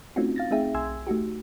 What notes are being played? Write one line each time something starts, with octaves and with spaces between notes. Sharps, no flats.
A3 C4 C#4 D#4 F4 F#4
F5 A6 A#6
A3 C4 D#4 G#4 E5 G5
B1 G#5 C6 E6 G#6
A3 D#4 F#4 G4